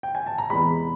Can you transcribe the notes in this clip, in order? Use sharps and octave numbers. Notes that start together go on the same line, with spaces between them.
G5
G#5
A5
A#5
E2 C3 E3 G#3 B5